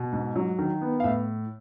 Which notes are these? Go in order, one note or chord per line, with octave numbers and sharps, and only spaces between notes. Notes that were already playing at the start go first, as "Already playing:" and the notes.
Already playing: B2
G#2
F#3
D#3
B3
F5
A2 E5